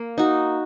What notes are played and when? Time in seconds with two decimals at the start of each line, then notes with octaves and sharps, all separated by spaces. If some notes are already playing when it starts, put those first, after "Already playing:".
Already playing: A#3
0.18 D#4 F#4